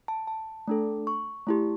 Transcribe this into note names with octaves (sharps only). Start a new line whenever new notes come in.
A5
A5
A3 D4 A4
C#6
A3 E4 G4